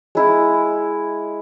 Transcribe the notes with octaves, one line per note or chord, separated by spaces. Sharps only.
G#3 E4